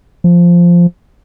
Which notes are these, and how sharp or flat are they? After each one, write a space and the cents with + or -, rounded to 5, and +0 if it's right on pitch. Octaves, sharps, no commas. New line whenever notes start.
F3 -5